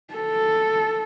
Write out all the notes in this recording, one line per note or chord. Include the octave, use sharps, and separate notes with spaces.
A4